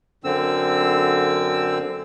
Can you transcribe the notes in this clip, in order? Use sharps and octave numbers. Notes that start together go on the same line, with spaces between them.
F#2 D3 C4 E6